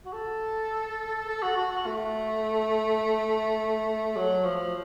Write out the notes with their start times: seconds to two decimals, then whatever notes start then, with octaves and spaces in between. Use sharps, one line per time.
0.06 F#4
0.13 A4
1.28 A4
1.43 F#4
1.57 F#4
1.71 F#4
1.86 A3
4.17 F#3
4.45 F3